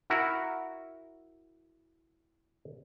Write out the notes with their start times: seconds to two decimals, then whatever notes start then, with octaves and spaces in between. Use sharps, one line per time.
0.10 E4 F#4 A#4